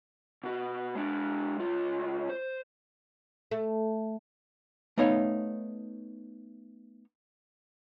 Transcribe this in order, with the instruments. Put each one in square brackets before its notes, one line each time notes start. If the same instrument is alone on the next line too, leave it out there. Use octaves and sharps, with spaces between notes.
[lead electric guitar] B2 F#4
G#3 D4
C#2 F4
C5
[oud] A3
[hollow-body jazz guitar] A3 B3 D#4 C#5 F5